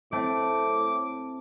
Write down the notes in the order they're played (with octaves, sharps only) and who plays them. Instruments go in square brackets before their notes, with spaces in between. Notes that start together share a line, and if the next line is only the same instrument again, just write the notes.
[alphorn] A2 [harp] A3 C4 [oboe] D6